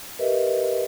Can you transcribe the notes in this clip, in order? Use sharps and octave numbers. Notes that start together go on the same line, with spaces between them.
G4 A#4 B4 D#5 E5